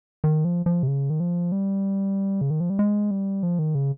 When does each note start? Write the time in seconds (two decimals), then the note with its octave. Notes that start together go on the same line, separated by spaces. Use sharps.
0.24 D#3
0.45 F3
0.66 F3
0.83 C3
0.87 C#3
1.10 D#3
1.20 F3
1.52 G3
2.41 C#3
2.50 D#3
2.60 F3
2.70 G3
2.79 G#3
3.11 G3
3.43 F3
3.59 D#3
3.75 C#3